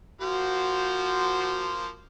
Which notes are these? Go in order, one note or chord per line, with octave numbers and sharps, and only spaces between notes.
F3 A#3 F#4 C5